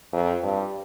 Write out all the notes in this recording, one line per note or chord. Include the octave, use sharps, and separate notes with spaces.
F2
G2